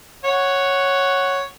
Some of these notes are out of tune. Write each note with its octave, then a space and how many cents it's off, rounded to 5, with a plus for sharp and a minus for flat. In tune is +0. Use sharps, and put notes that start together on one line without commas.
C#5 +0 F#5 +0